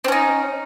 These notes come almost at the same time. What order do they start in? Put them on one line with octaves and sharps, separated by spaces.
C4 C#4 D#4